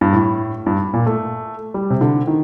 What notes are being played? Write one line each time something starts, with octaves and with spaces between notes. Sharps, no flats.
G2
A2
G2
A#2
A3
G3
C3
D3
D#3